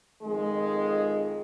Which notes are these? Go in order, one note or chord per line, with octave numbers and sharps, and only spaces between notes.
F2 D#3 G#3